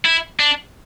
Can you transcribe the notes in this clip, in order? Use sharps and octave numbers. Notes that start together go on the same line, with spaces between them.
E4
D4